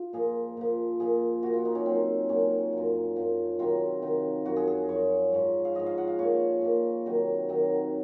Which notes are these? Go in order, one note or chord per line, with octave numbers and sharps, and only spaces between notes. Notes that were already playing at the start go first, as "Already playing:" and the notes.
Already playing: F4
A#2 F3 G#4
A#2 F3
A#2 F3 G#4
A#2 F3 F#4
F4
D#4
C#4
A#2 F#3 C4
A#2 F#3 C#4
F3
F#2
F#2 F3
C3 D#3 F#3 F4
C3 D#3 F#3
F#2 F3 F#4
G#4
G#4
F#2 F3 C#5
G#2 F3
F5
G#2 F3 D#5
F5
F#5
F5
A#2 F3 C#5
A#2 F3
C3 D#3 F#3
C3 D#3 F#3